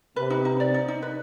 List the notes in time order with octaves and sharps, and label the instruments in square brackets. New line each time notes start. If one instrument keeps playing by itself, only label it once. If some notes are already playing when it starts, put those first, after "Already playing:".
[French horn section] C3 [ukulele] B4
[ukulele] D#4
D#4
D5
D#4
D#4
B4